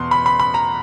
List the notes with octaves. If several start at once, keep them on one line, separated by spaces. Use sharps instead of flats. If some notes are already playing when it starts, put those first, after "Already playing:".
Already playing: E2 B2 B3 C6
B5
B5
B5
A#5